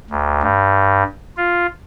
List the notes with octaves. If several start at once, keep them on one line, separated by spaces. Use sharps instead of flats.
D2
G2
F4